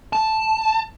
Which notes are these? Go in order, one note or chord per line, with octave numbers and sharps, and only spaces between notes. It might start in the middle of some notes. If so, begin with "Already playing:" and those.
A5